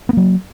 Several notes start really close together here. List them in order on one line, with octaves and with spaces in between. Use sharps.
B3 A#3 F#3